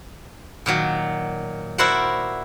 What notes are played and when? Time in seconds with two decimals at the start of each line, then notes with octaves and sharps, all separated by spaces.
0.66 A#2 D#3 F#3
1.78 E4 F#4 A#4 C5 D5 F#5